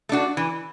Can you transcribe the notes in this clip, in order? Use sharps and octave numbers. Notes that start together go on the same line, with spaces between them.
A3 D4 F#4
E3